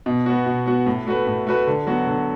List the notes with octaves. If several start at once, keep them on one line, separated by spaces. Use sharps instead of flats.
B2
B3 F#4
B2
B3 F#4
A2
A3 F#4 B4
A2
A3 F#4 B4
D3
F#3 B3 F#4
D3